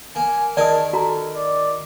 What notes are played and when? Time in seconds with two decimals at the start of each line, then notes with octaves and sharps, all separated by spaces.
0.16 A#3 G#5
0.57 D#3 G#4 A#4 D5 A5 D#6
0.93 F#4 A4 A#5
1.36 D5